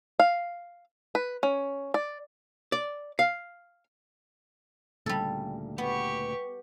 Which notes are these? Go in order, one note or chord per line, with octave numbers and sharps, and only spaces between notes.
F5
B4
C#4
D5
D5
F5
D2 A#2 C#3 G3 A4
B3 G4 B4 C#6